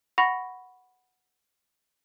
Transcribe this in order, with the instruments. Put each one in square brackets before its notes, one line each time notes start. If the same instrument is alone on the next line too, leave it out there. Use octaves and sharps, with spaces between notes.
[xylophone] F#5 B5 C#6 A#6 F7